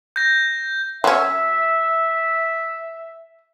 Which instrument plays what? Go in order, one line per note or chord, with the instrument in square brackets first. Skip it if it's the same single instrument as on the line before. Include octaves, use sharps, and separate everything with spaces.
[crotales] G6 A#6
[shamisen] F#3 C#4 [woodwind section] E5